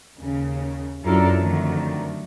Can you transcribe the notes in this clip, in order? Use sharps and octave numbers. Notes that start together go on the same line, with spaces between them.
D#2 C#3
F#2 D4 E4 F4 A4 A#4
F2 D3 D#3 F#3 A3